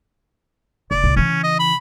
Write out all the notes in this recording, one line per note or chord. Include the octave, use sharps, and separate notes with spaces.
F1 D5
C2 A2
C#3 E3 C#4
D#5
B5